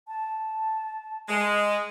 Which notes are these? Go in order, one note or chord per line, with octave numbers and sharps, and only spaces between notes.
A5
G#3